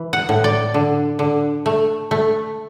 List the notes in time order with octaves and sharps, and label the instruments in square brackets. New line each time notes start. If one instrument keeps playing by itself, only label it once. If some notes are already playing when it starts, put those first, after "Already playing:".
Already playing: [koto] E3
F#5
A2
D5
D3
D3
A3
A3